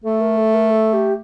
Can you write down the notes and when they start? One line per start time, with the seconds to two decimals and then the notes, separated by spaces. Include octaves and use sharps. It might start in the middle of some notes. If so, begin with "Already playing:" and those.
0.04 A3 A4
0.21 A#4
0.38 A4
0.54 A#4
0.70 A4
0.93 G4